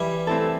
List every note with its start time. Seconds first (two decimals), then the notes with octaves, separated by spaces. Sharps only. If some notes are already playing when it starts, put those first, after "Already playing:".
Already playing: E3 G3
0.27 A3 C4 E4 A4